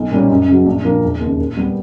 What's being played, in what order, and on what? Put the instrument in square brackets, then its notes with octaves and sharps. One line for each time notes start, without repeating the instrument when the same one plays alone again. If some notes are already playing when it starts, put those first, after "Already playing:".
Already playing: [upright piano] B1
A#2 G3 A#3 C#4
F#2
C#3 F#3
A#1
A#2 F3 A#3 D4
E1
D#2 C#3
A#2
G3 B3